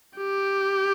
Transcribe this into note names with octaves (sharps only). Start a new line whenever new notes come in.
G4